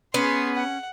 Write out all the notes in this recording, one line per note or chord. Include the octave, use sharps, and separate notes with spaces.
B3 C#4 G#4 C6
F#5